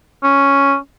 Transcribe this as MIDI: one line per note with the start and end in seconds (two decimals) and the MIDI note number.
0.23 0.75 61